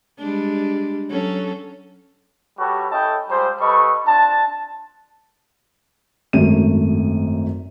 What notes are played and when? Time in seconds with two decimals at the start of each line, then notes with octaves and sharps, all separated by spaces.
0.18 G3 G#3 D4
1.09 F#3 C#4 A4
2.58 G3 F#4 G4 A4 B4 C#5
2.92 C#4 E4 A4 D#5 G5 A5
3.30 G3 G#3 F4 C5
3.60 G3 A4 B4 D#5 C#6
4.07 C4 D4 F4 A5
6.33 G#1 F#2 A3 D#7